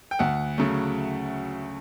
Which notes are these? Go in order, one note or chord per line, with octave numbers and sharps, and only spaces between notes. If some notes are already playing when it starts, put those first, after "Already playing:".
G5
D2 F#5
C#3 F#3 A3